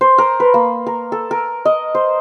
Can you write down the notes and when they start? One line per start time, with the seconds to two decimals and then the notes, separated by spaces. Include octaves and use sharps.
0.01 C5
0.18 A#4
0.40 B4
0.54 A#3
0.86 A#4
1.12 A4
1.31 A#4
1.65 D#5
1.95 C5